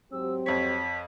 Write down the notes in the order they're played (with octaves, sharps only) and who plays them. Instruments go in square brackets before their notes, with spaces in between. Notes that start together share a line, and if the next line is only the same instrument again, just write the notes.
[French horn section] G#2 F#3 G4 [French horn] C4 [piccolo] E6
[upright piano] F2 C#5 [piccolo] B6